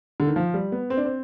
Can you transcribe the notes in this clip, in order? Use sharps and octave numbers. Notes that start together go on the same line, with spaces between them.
D3
D#3
F3
G3
B3
C4
D4
C4